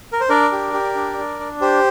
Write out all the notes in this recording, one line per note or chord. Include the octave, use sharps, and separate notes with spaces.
A#4
C5
D4 A#4 D5
G4
G4
D4
D4
D4
G4 C5